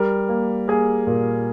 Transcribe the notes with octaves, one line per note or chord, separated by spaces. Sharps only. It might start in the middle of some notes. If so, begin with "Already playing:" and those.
Already playing: G3 A#4
A#3
A#3 G#4
A#2